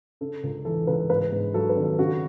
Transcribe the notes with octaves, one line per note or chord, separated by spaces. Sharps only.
C#3 A4
C#2
E3 A4
C#2 B4
G#2 B4
G#2
F#3 A4
B4
G#1
A4
C#3 F#4